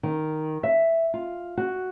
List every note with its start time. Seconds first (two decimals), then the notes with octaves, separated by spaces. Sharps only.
0.03 D#3
0.63 E5
1.14 F4
1.57 F#4